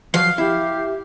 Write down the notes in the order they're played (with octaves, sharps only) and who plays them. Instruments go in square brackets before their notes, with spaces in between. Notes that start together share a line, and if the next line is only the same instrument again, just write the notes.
[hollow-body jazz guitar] F3 F#3 [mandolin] F5
[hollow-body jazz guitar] E4 [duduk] G4